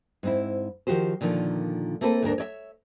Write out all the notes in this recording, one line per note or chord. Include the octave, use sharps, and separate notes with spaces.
G#2 C4 E4
D#3 F3 F#4 G4 C5
A#2 D3 D#3 F3
A3 A#3 C4 A4 B4
D2 G#2 A#3 D4 A#4
C#5 D5 E5